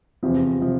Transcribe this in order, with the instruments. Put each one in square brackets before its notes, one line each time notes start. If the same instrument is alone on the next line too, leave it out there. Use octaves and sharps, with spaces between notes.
[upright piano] E2 C3 F3 [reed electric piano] C4
[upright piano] C3 F3